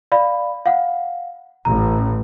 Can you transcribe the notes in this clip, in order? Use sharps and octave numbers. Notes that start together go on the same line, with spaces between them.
D5 F5 B5
F5 F#5
A1 A#5